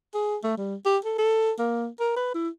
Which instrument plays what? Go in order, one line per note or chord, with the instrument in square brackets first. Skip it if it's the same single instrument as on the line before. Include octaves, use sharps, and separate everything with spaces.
[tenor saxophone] G#4
A3
G3
G4
A4
A4
A#3
A#4
B4
E4